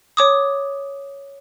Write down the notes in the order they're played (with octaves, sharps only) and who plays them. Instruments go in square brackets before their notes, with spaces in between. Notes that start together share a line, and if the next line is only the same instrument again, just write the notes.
[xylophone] C#5 D6 D#6